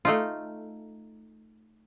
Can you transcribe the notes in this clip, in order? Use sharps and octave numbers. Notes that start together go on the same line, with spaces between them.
A3 D#4 F4